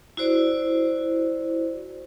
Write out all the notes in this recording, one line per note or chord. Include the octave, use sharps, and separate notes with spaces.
E4 F#4 C5 D5